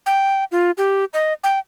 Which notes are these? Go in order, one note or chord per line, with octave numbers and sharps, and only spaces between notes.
G5
F4
G4
D#5
G5